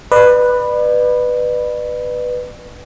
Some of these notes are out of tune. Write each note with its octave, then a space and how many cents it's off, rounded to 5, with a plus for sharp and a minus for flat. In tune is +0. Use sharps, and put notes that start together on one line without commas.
B4 +0 D5 +40